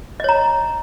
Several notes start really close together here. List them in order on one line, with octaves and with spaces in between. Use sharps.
D#5 C#5 A#5